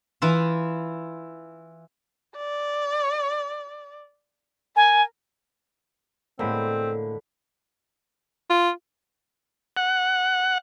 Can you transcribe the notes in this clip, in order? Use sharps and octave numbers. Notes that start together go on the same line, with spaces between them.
E3 E4 F4
D5
A#4 G#5
A2 D3 G#3 A#3 C4 B5
F4
F#5